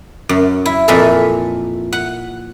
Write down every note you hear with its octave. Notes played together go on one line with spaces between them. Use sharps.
F#2
E4
F2 A#2 E3 A4 E5 A#5
F#5